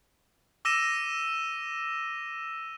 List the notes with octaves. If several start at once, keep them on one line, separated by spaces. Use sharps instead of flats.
D6 E6 A#6 D#7 E7